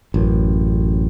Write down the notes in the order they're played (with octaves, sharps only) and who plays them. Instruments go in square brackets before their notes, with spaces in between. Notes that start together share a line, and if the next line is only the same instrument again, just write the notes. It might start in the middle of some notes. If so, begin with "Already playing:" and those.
[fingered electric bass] A1 F#2